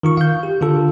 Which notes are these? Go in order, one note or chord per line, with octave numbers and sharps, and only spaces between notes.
D#3 F4 C#6
F5 G6
G4
D3 F4 A4